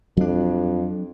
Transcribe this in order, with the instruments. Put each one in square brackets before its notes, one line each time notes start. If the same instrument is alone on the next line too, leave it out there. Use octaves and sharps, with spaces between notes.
[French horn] F2 [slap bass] F#3 D4